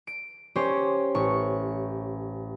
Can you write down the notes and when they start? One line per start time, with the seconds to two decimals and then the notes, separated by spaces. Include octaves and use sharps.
0.07 D7
0.56 C#4 G4 C5 C#5
1.15 A1 C#6